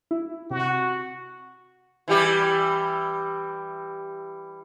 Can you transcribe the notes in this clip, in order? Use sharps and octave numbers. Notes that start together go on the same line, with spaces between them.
E4
C3 F#4
E3 G3 G4